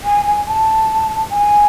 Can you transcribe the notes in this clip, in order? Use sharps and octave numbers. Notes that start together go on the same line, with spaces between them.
G#5
G#5
A5
G#5